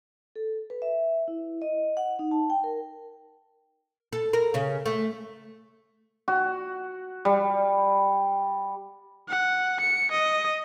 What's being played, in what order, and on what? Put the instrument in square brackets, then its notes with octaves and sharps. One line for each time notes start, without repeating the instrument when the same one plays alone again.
[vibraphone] A4
B4
E5
E4
D#5
F#5
D#4
A5
G5
A#4
[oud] A4
A#4
C#3 C#4
A3
[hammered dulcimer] F#4
G3
[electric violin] F#5
C#7
D#5